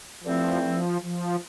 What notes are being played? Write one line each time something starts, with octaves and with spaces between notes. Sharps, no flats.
G2 D3 F3 A3 C4 E4
F3
F3